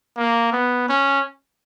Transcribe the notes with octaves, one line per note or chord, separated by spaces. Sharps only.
A#3
B3
C#4